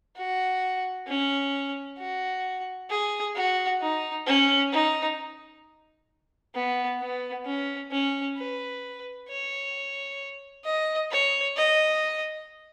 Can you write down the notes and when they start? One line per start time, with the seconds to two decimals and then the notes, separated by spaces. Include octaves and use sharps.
0.16 F#4
1.07 C#4
1.99 F#4
2.90 G#4
3.35 F#4
3.81 D#4
4.27 C#4
4.72 D#4
6.55 B3
7.00 B3
7.46 C#4
7.91 C#4
8.37 B4
9.29 C#5
10.65 D#5
11.11 C#5
11.57 D#5